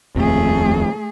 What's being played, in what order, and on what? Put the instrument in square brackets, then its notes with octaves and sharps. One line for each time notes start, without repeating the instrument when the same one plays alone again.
[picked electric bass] D#1 A#1 F2 [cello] A3 G#4